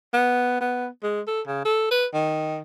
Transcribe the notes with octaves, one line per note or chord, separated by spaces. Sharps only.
B3
B3
G#3
A4
C#3
A4
B4
D#3